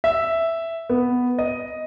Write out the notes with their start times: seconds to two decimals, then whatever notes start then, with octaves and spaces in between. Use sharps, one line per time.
0.04 E5
0.90 B3
1.39 D#5